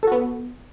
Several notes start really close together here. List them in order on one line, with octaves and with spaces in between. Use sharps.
A4 F#4 B3